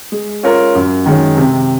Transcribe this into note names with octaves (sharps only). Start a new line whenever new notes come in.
G#3
C#4 F4 A#4 C#5
F#2
D#3 G#3 C#4
C3